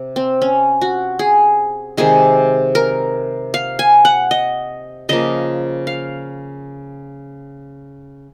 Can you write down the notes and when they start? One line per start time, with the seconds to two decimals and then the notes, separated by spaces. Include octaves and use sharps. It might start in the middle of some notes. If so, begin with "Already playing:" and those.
Already playing: C3
0.16 C4
0.42 C#4
0.81 F#4
1.19 G#4
1.97 C3 D#3 G#3 G#4
2.75 A#4
3.54 F5
3.79 G#5
4.05 F#5
4.31 D#5
5.09 C#3 F3 A#3 D#5
5.87 F5